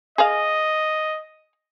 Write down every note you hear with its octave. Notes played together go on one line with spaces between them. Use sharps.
G#4 D#5 F5